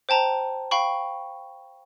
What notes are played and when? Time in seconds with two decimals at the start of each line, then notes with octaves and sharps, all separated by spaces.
0.09 C5 G5 A5 A#5
0.71 F5 G5 B5 C#6